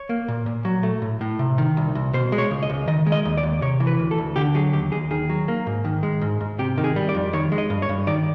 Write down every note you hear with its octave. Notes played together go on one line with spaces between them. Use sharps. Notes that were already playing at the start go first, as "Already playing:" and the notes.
Already playing: C#5
A#3
A#2
A#2
F#3
A3
A2
A2
C3
D#3
C2
C2
B2 C5
G#3
C#5
C#2
D#5
C#2
D#3 D#5
G#3
D#5
D#2
D5
D#2
C3 C#5
E3
B4
D2
A4
D2
D3 G4
F#3 G#4
D#2 G4
D#2 G#4
D#3 G#4
F#3
A#3
G#2
D#3
G#3
G#2
G#2
C3 G4
D#3
G#4
G3
D5
F2
D#3 C#5
G#3
D#5
G2
C#5
G2
D#3 D5